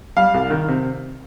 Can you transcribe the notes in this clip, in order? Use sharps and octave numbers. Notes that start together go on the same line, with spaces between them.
G3 F5
C2
D#3
C3